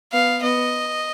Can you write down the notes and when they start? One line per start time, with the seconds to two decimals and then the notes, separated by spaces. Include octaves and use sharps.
0.12 B3 F5
0.42 B3 D#5